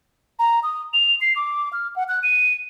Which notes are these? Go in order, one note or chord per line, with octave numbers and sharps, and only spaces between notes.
A#5
D#6
F7
C7
D6
F6
F#5
F#6
D#7